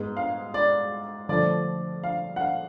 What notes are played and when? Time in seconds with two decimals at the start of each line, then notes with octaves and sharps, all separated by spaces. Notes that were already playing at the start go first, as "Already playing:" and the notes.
Already playing: G#2 G#3 B3
0.17 F5
0.54 D5
1.29 D3 F3 A3 D5
2.04 F5
2.36 F#5
2.41 F5